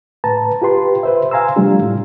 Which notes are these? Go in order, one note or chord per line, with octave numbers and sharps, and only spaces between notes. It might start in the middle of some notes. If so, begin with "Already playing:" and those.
A2 B4 A5 A#5
F4 G4 B4 C6
B4 C5 E5
F5 G#5 A#5 C6 E6
C3 F3 G3 A3 D4 F4
A2